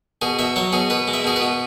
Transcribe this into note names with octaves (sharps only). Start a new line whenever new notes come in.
B2 G#4
B2 E5
F#3 C#5
B2 G#4
B2 B4
G#3
E5
B2 G#4
B4
B2